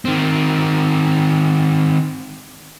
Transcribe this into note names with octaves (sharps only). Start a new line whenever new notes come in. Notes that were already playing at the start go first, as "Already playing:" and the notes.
D#3 C4